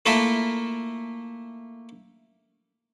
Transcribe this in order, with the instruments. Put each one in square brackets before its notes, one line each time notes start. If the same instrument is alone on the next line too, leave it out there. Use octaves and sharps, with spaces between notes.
[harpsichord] A3 A#3 E4 F4 A4 E5